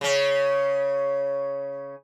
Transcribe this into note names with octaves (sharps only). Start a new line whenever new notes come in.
C#3 C#4